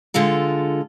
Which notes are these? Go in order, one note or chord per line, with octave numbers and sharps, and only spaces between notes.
D3 G#3 F4 A4